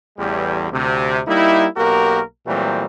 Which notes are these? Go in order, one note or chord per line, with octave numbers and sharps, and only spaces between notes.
A1 E2 G3
D2 C3
G3 A#3 D#4 E4
B1 A#3 F#4 G4 A#4
A#2 E3 F#3 G3 A3 C4